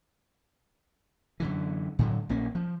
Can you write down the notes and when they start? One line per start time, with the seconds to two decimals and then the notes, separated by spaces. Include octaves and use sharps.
1.40 F#2 D3 E3
1.99 A2 D3 F#3
2.29 A#1 A#3 C#4
2.55 F3